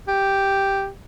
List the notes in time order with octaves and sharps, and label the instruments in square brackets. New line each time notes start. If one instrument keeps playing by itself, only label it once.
[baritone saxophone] G4